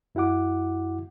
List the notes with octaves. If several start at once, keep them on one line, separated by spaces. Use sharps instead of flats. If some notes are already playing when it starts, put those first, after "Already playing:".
F#2 E4 F#4 F#5 D6